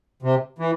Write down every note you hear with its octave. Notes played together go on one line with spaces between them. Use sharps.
C3
E3